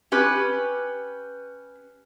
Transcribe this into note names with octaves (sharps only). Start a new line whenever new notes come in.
C#4 G4 B4